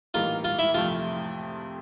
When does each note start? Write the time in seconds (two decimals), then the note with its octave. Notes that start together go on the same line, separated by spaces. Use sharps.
0.14 A2 E3 G3 A#3 D#4 F4
0.45 F4
0.59 E4
0.74 F2 C3 F3 A3 F4